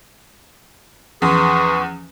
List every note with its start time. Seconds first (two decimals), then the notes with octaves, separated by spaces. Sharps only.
1.22 E2 F3 C#4 G#4 B4 C6 C#6 D#6